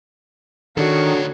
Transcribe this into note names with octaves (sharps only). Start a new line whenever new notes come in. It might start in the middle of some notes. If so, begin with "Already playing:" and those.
D2 D#3 D4 F#4 A4 C#5